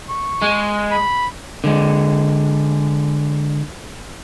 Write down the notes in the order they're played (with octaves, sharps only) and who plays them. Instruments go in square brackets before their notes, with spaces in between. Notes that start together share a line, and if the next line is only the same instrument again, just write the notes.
[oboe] C#6
[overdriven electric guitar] G#3
[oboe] B5
[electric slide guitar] D3 G#3